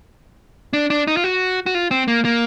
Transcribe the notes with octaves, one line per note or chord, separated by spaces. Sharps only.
D4
D4
D#4
F4
F#4
F#4
F4
C4
A#3
A#3